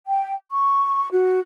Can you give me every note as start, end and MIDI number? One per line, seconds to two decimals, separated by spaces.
0.06 0.34 79
0.50 1.08 85
1.12 1.39 66